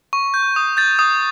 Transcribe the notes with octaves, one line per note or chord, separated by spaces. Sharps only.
C#6
G6
D#6
G6 A6
D#6